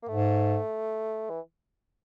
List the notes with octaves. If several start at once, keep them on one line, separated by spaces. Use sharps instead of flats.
A#3
G#2 A3
E3